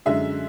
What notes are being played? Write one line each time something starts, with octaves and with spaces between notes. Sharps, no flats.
F#2 D3 G#3 E5